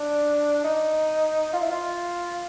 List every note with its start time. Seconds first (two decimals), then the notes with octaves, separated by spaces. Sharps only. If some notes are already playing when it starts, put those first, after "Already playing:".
Already playing: D4
0.64 D#4
1.53 F4
1.62 E4
1.70 F4